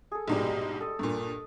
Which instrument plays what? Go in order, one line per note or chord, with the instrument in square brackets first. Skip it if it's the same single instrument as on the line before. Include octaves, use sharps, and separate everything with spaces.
[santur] G#4 A4
[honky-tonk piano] A#1 G#2 B2 [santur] G3 G#3
[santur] A4 D#5
[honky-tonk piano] G2 A#2